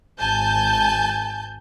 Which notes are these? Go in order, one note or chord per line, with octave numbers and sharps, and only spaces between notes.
G#1 G#5 A5 G6